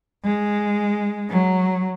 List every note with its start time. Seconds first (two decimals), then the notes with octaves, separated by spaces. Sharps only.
0.25 G#3
1.30 F#3